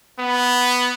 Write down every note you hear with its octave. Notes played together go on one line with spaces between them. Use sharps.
B3